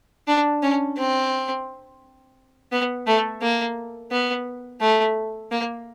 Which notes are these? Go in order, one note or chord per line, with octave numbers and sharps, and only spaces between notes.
D4
C#4
C4
B3
A3
A#3
B3
A3
A#3